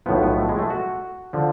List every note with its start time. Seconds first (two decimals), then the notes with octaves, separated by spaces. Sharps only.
0.06 B1 A2 F3 B3
0.23 B3
0.38 A3
0.49 G#3
0.59 A3
0.70 F#4
1.33 D3 F3